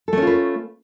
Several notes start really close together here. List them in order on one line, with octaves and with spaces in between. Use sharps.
A4 A3 C#4 F4 B4